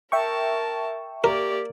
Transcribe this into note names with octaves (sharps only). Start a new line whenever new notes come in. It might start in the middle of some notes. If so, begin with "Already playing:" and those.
A#4 E5 G5 A5 C#6
A#3 G4 A#4 D5